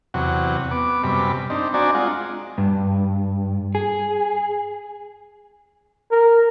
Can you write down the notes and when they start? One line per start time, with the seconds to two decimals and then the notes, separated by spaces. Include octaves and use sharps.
0.14 E2 C3 F#3 F#5
0.71 B3 D6
1.03 F#2 C3 G3 B5
1.50 C4 D4 D#4
1.74 C4 D4 F#4 D5 G#5 A#5
1.95 G#3 F4 F#5
2.58 G2
3.75 G#4
6.11 A#4